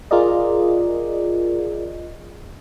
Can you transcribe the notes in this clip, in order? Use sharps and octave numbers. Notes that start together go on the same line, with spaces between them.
F4 G#4 A#4 D5 D#5